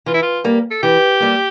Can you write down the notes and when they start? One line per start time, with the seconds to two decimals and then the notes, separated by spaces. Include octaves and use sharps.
0.06 E3 F4
0.14 E4
0.22 F4
0.44 G3 A#3
0.71 A4
0.83 E3 G4
1.20 G3 A#3